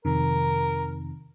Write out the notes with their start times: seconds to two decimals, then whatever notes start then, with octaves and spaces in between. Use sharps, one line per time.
0.05 F2 C3 D#3 A#4